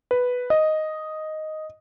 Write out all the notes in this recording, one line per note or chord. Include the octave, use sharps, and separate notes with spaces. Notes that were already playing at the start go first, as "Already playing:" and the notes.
B4
D#5